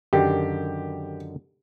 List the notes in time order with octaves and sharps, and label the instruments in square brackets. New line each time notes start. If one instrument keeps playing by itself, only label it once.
[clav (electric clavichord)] F#2 D3 D#3 [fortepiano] G4